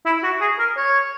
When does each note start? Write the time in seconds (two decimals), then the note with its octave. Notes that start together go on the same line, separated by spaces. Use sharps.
0.06 E4
0.24 F#4
0.41 G#4
0.59 A#4
0.77 C#5